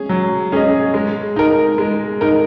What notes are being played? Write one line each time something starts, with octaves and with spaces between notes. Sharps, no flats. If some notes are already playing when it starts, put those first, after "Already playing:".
Already playing: C#4 G#4
F#3
C#4 G#4 D#5
G#3
D#4 A#4
G#3
D#4 A#4